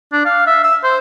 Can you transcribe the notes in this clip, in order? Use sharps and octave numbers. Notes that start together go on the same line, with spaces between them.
D4
F5
E5
E6
C5